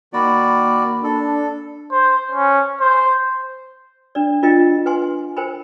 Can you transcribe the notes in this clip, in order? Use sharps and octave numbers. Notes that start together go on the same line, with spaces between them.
D#3 A#3 F#4 D5 B5
D4 A4
C5
C#4
C5
D4 D5
D4 F4 A#4 D#5 G5
B4 F#5 G#5 C6
A#4 C5 G5 G#5 B5